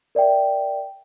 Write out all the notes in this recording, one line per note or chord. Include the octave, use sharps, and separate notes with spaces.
A#4 D5 E5 G5